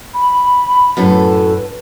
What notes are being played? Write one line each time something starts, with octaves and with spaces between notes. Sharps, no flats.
B5
F#2 A2 A4 B4